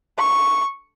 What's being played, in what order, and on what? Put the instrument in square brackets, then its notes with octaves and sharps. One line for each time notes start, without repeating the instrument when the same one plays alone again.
[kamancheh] C#6